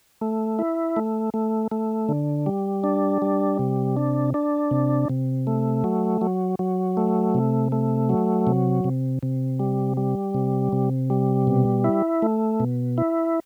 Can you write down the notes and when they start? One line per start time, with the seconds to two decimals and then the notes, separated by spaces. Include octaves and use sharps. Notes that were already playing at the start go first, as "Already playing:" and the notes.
0.21 A3
0.59 E4
0.96 A3
1.34 A3
1.71 A3
2.09 D3
2.46 G3
2.84 D4
3.22 G3
3.59 C3
3.97 D4
4.34 D4
4.71 C3
5.09 C3
5.47 A3
5.84 F#3
6.21 F#3
6.59 F#3
6.97 A3
7.35 C3
7.72 A3
8.09 F#3
8.47 C3
8.84 C3
9.23 C3
9.60 G3
9.97 G3
10.34 C3
10.72 C3
11.10 G3
11.47 B2
11.84 E4
12.22 A3
12.60 B2
12.98 E4